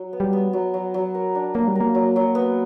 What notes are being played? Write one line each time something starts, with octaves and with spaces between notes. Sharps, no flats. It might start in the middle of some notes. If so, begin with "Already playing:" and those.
Already playing: F#3
B3
G3
B3
F#3
F#3
F#3
A#4
D4
F#3 A#3
G3
A#4
A#3
F#3
F#3
B3